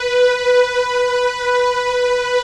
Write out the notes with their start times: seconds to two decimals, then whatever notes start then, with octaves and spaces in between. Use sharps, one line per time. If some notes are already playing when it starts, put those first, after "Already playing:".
Already playing: B4
0.38 B4